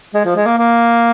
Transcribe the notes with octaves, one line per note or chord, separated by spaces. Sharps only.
G#3
F3
G#3
A#3
A#3